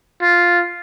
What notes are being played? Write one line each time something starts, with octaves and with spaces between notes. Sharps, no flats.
F4